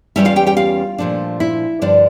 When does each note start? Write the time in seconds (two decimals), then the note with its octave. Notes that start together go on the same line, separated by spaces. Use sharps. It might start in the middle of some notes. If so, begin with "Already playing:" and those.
0.16 E2 E3 G3 C#4 E4 E5
0.25 F4 F5
0.36 G4 G5
0.47 G4 G5
0.57 F4 F5
0.98 A#2 F3 A3 D4
1.40 E4 E5
1.81 G2 D3 F3 D4 D5